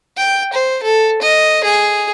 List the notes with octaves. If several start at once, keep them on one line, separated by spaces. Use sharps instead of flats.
G5
C5
A4
D#5
G#4